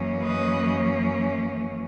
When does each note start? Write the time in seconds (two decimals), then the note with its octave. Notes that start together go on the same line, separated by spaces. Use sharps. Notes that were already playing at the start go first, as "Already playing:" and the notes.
Already playing: F#2 E3 A#3 C#4
0.23 B4 D#5